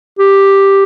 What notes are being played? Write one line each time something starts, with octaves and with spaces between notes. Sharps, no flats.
G4